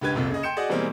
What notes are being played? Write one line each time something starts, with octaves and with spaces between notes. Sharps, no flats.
C#2 G2 G4 B4 G#6
D#1 C2 F2 C3
C#3 G#4 D#5
G5 C6 G6 C#7 E7
F#4 G#4 D5 D#5
B2 E3 G3 G#3 A#3 C4